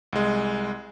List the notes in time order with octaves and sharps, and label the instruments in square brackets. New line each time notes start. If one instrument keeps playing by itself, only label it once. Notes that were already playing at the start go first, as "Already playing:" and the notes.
[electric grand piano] C2 G#3